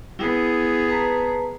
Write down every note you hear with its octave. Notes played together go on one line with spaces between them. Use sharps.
B3 E4 G#4
B4 A5 A#5